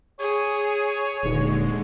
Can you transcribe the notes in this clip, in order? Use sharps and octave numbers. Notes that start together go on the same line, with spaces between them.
G#4 C#5
D#1 D3 G#3